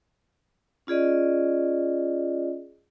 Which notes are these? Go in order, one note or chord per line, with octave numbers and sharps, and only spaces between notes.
C#4 F4 G#4 D5 D#5